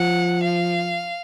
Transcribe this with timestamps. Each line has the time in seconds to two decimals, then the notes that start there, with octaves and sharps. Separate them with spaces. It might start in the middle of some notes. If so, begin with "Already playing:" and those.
Already playing: F3 F#5
0.43 F5